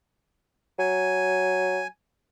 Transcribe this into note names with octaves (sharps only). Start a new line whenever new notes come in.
F#3 G#5